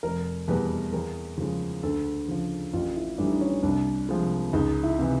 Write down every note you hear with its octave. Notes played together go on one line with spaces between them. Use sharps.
F1 A#4
E2 B2 G3 B4
E2 A#4
C#3 F3 G#3
D2 A4
C#3 F3
A1 F4
E4
A2 E3 G3 D4
D#4
D4
C#4
C2 D4
C3 F3 G#3
C#2 D#4
E4
C3 E3